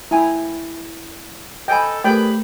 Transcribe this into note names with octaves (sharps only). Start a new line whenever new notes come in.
E4 G5 G#5 A#5
A4 D#5 G5 G#5 B5
A3 G4 G#4 A#4 B4 D5 G5 B5